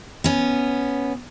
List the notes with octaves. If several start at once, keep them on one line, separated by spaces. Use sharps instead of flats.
B3 C#4